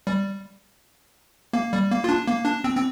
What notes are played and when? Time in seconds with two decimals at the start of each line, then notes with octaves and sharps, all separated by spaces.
0.07 G3
1.53 A#3
1.73 G3
1.91 A#3
2.04 F4
2.09 D4
2.27 A#3
2.45 D4
2.64 C4
2.77 C4